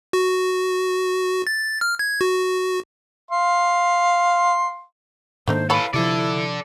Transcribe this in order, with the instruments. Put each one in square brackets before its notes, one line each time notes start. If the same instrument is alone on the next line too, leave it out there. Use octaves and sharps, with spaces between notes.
[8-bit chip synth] F#4
A6
F6
G#6
F#4
[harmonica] F5 C6
[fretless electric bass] G#2 D#3 A#3 [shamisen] A3 D4 D#4 [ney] C5
[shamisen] E3 C#5 B5 [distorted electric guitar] A4 B4 [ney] F5
[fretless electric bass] C3 F3 [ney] E4 [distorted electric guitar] A4 D5